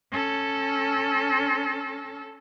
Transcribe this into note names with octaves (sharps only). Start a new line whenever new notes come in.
C#4 A4